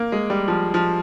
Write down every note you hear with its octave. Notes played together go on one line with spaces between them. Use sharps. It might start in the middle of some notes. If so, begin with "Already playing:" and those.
Already playing: A#3
G#3
G3
F3
F3